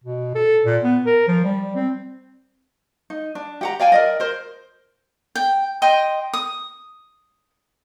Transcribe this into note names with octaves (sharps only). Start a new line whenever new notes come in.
B2
A4
A#2
B3
A#4
F3
G3
C4
D#4
D4
G4 F#5 A#5
D5 F5 G5 G#5
A#4 D5 D#5
A#4 C5
G5
D#5 G5 C6
D#6